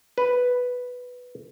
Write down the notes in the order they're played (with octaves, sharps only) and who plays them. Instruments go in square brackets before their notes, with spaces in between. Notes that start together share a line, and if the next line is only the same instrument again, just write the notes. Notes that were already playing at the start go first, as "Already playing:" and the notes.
[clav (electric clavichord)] B4